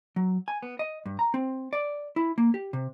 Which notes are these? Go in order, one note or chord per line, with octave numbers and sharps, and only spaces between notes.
F#3
G#5
B3
D#5
G2
A#5
C4
D5
E4
A#3
G4
C3